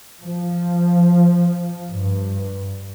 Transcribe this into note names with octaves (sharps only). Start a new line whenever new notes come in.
F3
G2